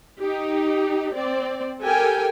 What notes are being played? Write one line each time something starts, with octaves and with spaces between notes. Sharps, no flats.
D#4 G4
C4 D5
G4 A4 A#4 G5 G#5